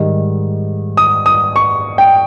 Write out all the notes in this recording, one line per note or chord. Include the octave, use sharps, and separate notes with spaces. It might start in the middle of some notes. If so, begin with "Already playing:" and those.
Already playing: G#2 D#3 G3
D#6
D#6
C#6
G5